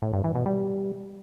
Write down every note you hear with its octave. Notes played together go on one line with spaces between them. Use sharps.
A2
G2
E3
B2
G3